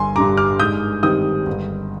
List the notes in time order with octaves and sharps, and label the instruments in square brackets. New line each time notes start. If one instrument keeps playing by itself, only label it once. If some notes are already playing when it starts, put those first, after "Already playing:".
Already playing: [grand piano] G1 G#5 C6
G2 D3 G3 A#5 D6
D6 F6
G#2 D#6 G6
D#3 G3 C4 D#6 G6
G1